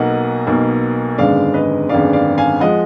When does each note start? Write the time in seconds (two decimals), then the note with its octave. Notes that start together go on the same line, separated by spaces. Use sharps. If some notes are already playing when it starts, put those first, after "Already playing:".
Already playing: B1 B2 A#3 D#5 F#5
0.47 B1 B2 A#3
1.18 G#1 F#2 D3 G#3 B3 D5 F5
1.54 B4 D#5
1.89 G#1 F#2 D3 G#3 B3 D5 F5
2.13 D5 F5
2.38 F5 G#5
2.60 F3 G#3 D#5 F#5